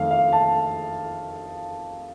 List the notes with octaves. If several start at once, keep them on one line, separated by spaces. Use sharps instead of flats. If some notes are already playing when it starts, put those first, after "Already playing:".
Already playing: F2 D#3 A3 F5
F5
A5